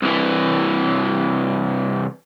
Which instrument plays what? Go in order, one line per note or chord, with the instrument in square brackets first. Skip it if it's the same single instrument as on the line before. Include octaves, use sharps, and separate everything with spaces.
[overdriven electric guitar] C2 E3